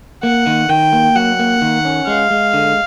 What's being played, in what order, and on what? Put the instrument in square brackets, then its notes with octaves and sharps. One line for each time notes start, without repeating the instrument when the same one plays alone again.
[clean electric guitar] A#3 [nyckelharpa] F#5
[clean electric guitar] D#3
[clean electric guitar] D#3 [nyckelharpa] G5
[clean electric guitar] A#3
[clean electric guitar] F#3 [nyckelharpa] F#5
[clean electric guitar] A#3
D#3
C#4
[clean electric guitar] G#3 [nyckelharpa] F5
[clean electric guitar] G#3
D3